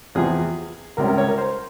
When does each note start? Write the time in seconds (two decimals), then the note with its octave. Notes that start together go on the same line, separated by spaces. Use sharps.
0.15 E2 C3 F3 G#4
0.97 C#2 C3 G3 C#4 A#4
1.08 A#4
1.18 C#5
1.28 A#4
1.38 C5